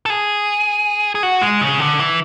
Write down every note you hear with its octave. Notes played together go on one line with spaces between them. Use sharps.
A4
G#4
G#4
F#4
G#3
C#3
D3
E3